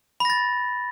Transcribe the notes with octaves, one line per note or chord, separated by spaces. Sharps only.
B5 A6 A#6